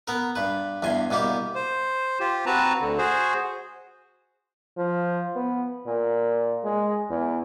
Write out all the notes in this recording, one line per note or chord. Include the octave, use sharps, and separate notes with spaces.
B3 A#4
G2 B4
E2 G2 G#5 C6
C2 B2 A#3 G4
C5
F4 G4
C4 F#4 B4 A5 A#5
D2 D3
F#4 G#4 C5
F3
B3
A#2
G#3
E2